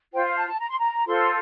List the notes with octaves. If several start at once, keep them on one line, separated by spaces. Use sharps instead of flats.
F4 C5 G5
F5
A5
A5
A#5
C6
A#5
F4 A4 C5 C6